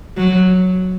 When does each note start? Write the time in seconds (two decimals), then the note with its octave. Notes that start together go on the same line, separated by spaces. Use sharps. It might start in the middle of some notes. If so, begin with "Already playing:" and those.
0.17 F#3